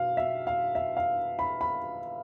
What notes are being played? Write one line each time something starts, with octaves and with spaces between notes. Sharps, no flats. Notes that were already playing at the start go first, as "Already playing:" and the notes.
Already playing: B2 F5
E5
F5
E5
F5
B5
B5